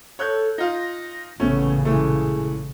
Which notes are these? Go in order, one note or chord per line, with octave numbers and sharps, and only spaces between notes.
A4 C#5 F#6 G6
D#4 F4 A#6
A1 A#2 C#3 A3 B3 C#4
E3 G#3 A3 G#4